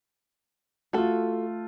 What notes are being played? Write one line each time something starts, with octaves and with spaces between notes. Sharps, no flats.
A3 F4 F#4 A4